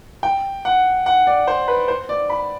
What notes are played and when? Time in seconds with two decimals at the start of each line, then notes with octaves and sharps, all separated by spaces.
0.23 G5
0.65 F#5
1.06 F#5
1.27 D5
1.47 C5
1.68 B4
1.88 C5
2.09 D5
2.30 B5